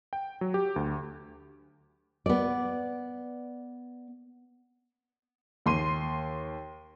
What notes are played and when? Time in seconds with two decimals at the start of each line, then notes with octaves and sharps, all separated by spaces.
0.13 G5
0.41 F#3
0.54 G4
0.76 D2
2.26 B3 D5
5.66 D#2 C6 D#7